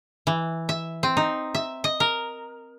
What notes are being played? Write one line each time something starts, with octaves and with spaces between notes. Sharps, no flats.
E3
E5
C4
D#4
E5
D#5
A#4